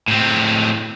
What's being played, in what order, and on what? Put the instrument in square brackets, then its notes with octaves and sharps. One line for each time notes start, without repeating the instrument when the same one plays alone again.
[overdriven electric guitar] A2 C4